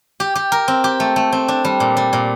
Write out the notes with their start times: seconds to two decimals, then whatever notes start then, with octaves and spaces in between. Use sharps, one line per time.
0.20 G4
0.35 G4
0.52 A#4
0.68 C4
0.84 G4
1.00 A3
1.16 A3
1.32 C4
1.48 D4
1.65 G3
1.80 A#2
1.97 G3
2.13 A#2